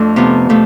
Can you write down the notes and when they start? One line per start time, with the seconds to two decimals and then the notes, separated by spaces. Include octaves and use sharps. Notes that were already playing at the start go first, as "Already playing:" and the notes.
Already playing: F2 A3 D4
0.16 C3 F3 B3
0.49 C3 F3 A3